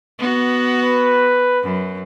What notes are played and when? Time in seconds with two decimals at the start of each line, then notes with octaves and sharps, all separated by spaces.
0.19 B3 F#4
0.83 B4
1.63 F#2